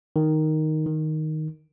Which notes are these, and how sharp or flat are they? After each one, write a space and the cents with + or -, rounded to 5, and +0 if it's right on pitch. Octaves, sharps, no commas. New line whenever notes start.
D#3 +0
D#3 +0